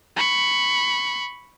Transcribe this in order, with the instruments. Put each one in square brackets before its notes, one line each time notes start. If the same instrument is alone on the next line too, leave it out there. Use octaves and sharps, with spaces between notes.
[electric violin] B5 C#6